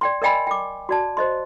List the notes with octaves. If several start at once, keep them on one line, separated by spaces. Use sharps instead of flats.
D5 G5 C6
A#4 D5 D#5 G5 G#5 B5
G5 D6
F#4 D5 A5
C5 D#5 C6